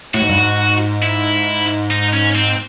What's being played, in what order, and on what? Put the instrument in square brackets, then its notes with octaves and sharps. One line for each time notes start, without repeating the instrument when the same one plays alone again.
[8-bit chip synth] A2 [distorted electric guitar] F#4
[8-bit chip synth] G#2
G2
G#2
[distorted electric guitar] E4
D#4
C#4
C4